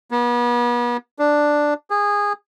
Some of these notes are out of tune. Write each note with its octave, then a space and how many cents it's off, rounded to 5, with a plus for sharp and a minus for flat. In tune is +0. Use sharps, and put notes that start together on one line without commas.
B3 -40
D4 +5
G#4 -20